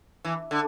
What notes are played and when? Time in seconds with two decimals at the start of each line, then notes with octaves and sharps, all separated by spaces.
0.25 E3
0.51 D3